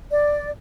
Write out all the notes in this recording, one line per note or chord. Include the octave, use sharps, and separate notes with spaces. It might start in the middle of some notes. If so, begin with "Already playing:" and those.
D5